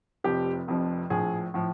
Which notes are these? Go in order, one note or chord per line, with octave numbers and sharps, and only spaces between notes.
F1 F2 C3 F3 G4
F1 F2 C3 F3
A#1 A2 F3 G#4
A2 F3